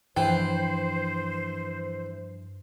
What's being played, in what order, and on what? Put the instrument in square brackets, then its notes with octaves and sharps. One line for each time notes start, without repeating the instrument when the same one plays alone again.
[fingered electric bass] G2 F3 [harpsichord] E3 [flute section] C5 [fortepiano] G5